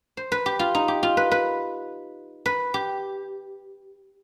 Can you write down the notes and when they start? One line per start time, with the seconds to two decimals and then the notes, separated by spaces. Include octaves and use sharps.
0.17 C5
0.32 B4
0.46 G4
0.59 F4
0.75 D#4
0.88 G4
1.03 F4
1.17 B4
1.31 B4
2.46 B4
2.74 G4